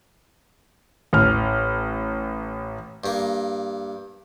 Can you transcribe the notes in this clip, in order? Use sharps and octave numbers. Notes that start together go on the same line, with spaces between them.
A1 F6
G2 A#3